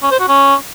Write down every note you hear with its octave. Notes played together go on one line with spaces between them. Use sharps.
C#4
C5
F#4
C#4